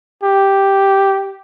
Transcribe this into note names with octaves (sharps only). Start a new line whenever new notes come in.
G4